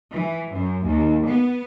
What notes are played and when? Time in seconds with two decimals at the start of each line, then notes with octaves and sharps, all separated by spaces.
0.14 E3
0.53 F#2
0.85 D#2
1.27 B3